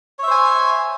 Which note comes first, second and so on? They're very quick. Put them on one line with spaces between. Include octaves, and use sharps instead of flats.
C#5 E5 C5 G#5